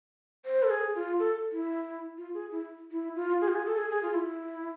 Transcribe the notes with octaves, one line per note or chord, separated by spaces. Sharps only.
C5
A4
G#4
F4
A4
E4
F4
G#4
E4
E4
F4
G#4
F4
G#4
A4
G#4
G#4
F4
E4